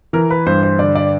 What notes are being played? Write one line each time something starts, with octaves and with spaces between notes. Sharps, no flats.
E3 A#4
B4
G2 C5
C5
D3 D5
D5